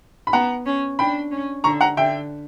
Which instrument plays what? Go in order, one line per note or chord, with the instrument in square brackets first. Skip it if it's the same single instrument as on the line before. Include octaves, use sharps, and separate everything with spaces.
[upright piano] B5
[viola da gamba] B3 [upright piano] F#5 A#5
[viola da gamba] C#4
[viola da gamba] D4 [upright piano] G5 B5
[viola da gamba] C#4
[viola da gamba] D3 [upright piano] A#5 C#6
[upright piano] F#5 A#5
[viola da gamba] D3 [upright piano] E5 G5